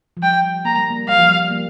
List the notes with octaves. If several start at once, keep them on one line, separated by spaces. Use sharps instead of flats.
F3
G3 G5
A#3 A#5
G3
A#3
G3 F5
F3
G3
A#3